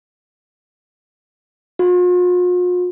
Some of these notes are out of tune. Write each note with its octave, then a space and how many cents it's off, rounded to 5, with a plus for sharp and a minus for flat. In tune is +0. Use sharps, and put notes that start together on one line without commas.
F4 +45